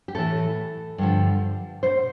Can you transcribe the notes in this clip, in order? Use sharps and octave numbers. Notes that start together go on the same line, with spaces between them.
G4
A2 E3 A4
G2 D3 F3
B2 C5